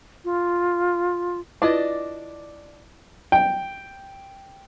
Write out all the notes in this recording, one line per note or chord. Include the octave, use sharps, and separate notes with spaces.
F4
D4 E4 F4 B4 D5 D#5
G5